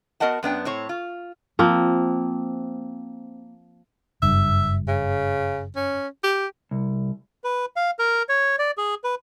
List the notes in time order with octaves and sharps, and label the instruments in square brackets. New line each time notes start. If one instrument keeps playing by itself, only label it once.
[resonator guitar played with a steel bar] B3 F#4 A#4 D#5 F#5 A5
F#2 B3 D4 G5
A2 C4 C#5
F4
[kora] F3 A#3 C4
[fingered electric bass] F#1 G2 [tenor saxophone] E5
[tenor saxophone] C#3
C#4
G4
[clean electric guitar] C2
[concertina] B4
F5
A#4
C#5
D5
G#4
B4